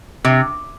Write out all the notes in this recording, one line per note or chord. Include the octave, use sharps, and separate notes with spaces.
C3